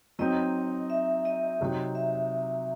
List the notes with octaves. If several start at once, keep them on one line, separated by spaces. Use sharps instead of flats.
F#3 C4 D#4 D#5
E5
D#5
C3 F#3 C4 D#4
E5